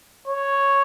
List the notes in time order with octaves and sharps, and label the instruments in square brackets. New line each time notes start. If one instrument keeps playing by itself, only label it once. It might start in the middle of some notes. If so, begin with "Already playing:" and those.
[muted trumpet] C#5